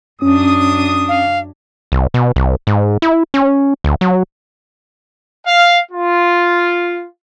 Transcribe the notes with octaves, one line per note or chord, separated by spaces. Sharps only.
F#2 C#4 D4 D#6
F5
C2
B2
C2
G#2
E4
C#4
D2
F#3
F5
F4